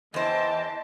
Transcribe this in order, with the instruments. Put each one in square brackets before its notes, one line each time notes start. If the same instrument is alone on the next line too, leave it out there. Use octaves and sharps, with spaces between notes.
[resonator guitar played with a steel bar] E2 C5 [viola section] E3 G5 A5 [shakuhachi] D#5